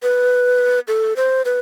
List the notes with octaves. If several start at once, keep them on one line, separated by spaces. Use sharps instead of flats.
B4
A4
C5
B4